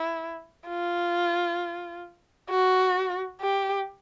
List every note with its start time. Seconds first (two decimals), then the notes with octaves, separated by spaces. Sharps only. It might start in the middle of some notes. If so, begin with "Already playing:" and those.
Already playing: E4
0.68 F4
2.50 F#4
3.41 G4